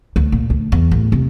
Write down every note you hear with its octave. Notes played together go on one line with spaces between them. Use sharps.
D2
A#2
D2
E2
A1
C3